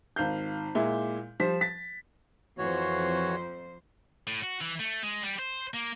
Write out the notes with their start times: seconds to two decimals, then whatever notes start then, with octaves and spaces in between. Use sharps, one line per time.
0.16 G#1 F5 G6
0.75 A#2 G#3 E4
1.40 F3 G3 C5 B6
1.61 A6 B6
2.58 F2 E3 F#4 C5 C#5
4.27 A2
4.43 F#4
4.61 E3
4.79 A3
5.03 G#3
5.22 G3
5.39 C5
5.74 A#3